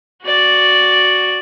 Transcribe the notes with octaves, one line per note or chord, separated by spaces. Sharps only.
F#4 D5